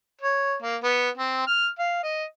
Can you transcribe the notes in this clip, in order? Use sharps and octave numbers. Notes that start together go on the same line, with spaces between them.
C#5
A#3
B3
C4
F6
F5
D#5